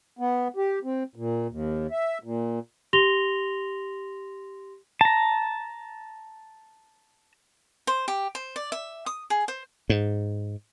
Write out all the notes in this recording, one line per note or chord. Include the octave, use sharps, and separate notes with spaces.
B3
G4
C4
A#2
D#2
E5
A#2
G4 C6 A#6 F7 G7
A5 A#5
C5
G4
C5
D5
E5
D#6
G#4
C5
G#2